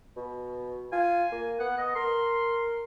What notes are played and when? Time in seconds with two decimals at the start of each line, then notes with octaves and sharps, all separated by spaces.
0.17 B2
0.92 F4 G#5
1.32 A#3
1.60 B3 F#5
1.78 D#5
1.96 A#4 C6